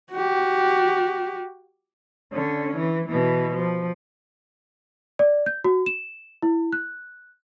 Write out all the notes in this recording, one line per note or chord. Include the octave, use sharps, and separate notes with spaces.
F#4 G4
D3 C#4
E3
B2 E3
F3
D5
G6
F#4
E7
E4
F#6